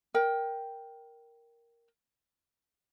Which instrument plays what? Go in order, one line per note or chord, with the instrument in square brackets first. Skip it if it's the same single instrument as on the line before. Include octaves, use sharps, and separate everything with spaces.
[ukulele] A#4 G5